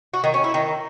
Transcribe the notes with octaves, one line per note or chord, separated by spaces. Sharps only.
F#4
D#3
C#4
E4
D#3